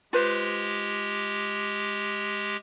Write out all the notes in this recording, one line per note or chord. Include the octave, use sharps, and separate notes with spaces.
G#3 F4 G4 B4 C5